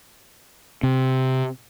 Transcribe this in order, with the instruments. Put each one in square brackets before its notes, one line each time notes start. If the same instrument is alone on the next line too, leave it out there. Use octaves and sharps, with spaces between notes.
[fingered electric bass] C3